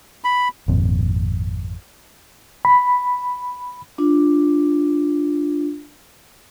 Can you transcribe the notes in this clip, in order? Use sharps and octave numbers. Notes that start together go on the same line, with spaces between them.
B5
G#1 F2 A#2 C4
B5
D4 F4